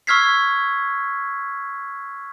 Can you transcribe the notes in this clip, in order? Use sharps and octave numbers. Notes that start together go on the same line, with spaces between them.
C#6 E6 F6 G#6 B6 C7